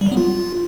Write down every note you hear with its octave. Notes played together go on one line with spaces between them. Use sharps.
G3
F#3
B3
F4